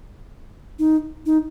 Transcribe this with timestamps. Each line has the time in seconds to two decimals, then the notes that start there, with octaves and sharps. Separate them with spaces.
0.79 D#4
1.26 D#4